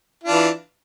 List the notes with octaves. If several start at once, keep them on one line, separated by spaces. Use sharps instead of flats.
E3 D4 F4